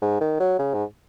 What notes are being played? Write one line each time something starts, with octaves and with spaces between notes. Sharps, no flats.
G#2
D#3
F#3
C#3
G#2